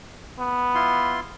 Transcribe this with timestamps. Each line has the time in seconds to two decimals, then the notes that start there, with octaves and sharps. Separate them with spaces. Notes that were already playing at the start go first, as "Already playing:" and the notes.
0.39 B3
0.75 E4 F4 C6